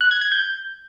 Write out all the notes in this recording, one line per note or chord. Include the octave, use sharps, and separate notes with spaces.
F#6
G#6
G#6
G6